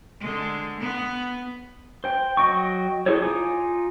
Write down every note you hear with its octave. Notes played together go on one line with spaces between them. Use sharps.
D3 G#3
B3
C5 G5
F#3 D#5 G5 C#6
E4 G#4 A4 C5 C#5
D#4 F4 G#5 D6 D#6